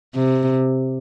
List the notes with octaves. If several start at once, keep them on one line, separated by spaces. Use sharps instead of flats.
C3